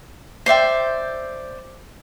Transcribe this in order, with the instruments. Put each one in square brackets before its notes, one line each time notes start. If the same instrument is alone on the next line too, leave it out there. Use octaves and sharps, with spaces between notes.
[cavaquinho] C5 D5 E5 G5